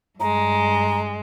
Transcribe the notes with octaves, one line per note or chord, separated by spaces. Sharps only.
G2 G#3 A#5